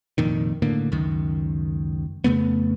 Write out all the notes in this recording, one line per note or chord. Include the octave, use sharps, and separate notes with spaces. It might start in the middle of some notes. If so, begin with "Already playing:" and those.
F1 F2 A#2 D#3
A2 D3 A#3
C#2 F#2 D#3
F2 C#3 A3 B3